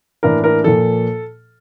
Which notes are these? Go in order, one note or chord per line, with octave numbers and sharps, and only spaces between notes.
A2 E3 A#3 D4 A#4
A#4
A#2 F3 A#3 A4